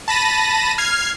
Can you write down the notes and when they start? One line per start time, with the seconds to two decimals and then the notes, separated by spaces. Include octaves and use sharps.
0.08 A5 B5 A#6 D#7
0.78 F6 G#6 C7